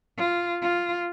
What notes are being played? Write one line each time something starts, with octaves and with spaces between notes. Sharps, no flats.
F4
F4